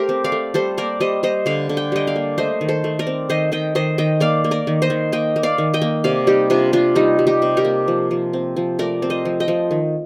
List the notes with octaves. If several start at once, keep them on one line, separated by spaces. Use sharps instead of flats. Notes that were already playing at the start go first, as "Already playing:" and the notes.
Already playing: A3 G4 A#4 C5
C4
D5 F5
A3
G3 A4 C5
A#3 A#4 D5
G3 C5 D#5
G3 C5 D#5
D3 D5 F5
D3
G5
G3 D#5 G5
D5 F5
A#3
A3 C5 D#5
D#3
A4 C5
A3
A#4 D5
C4
D#3 C5 D#5
D#3 D#5 G5
D#3 C5 D#5
D#3 D#5 G5
A#3 D5 F5
A#3
A#4 D5
D#3
C5 D#5
D#3
A#3 D#5 G5
A#3
D5 F5
D#3
D#5 G5
A#3
C3 D5 F5
G3 D#4 G4
C3 D4 F4
C3 D4 F4
G3 D#4
G3
D#4 G4
C3
G4 A#4
A#3
F3
F3
C4
F3
A3 A#4 D5
C4
C5 D#5
F3
D#5 G5
F3
D#3